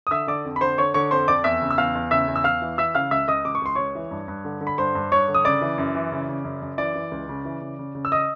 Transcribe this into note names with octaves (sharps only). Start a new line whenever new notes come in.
D#6
D3 E5 E6
D3 D5 D6
F2
B5
D3 C5 C6
D3 C#5 C#6
D3 C#5 C#6
F2 C5 C6
F2 D5 D6
E2 E5 E6
C#3
E6
E2 F5 F6
E2
C#3 E5 E6
E2
E6
E2 F5 F6
E3
E3 E5 E6
C#3 F5 F6
C#2 E5 E6
C#2 D#5 D#6
C#2 D6
C#6
C#2 C6
C#2 C#5 C#6
E3
G2
G2
D3
D3
B5
G2 C5 C6
G2
G2 C#5 C#6
D3
D#6
C#3 D5 D6
E3
F#2
E3
C#3
C#3
F#2
F#2
E3 D5 D6
E3
C#2
C#3
E3
C#3
C#3
C#3
E6
D#5 D#6